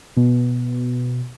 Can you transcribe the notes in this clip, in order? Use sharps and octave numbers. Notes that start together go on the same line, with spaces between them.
B2